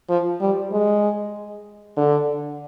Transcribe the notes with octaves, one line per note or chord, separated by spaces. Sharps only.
F3
G3
G#3
D3